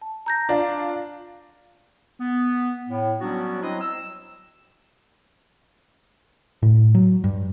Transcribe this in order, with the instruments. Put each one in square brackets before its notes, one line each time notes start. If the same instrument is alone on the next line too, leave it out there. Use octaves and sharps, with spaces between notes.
[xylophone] A5
A#5 G6 A#6
[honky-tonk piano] D4 F4
[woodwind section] B3
A2
F#3 G3 B3 C#4 D4 F#4
F#3 C4 E4 C5 D#5
E6
[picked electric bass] A2
F#3
G2